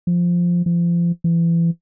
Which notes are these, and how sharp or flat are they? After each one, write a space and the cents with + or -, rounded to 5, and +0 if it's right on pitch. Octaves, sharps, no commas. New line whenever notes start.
F3 +0
F3 -30
E3 +30